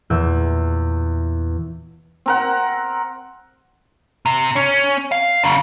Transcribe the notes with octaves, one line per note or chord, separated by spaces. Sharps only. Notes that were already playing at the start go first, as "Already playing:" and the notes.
E2 A#2 E6
C4 A#4 F#5
C3
C#4
F5
F#2 C#3